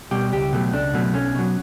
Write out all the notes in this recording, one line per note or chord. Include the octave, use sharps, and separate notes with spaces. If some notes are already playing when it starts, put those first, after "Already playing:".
B2 G3 G4
C#2 G4
B2 F#3 A3
C#2 D4
B2 F#3 A3
B1 C#4
B2 F#3